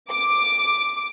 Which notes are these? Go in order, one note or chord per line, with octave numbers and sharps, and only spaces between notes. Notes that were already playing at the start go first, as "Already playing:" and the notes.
D6